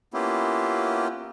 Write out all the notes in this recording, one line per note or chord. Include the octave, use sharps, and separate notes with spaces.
A#3 B3 C#4 E4 F4 G4